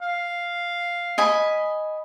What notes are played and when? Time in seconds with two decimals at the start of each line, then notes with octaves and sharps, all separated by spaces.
0.02 F5
1.18 D#5 G#5 B5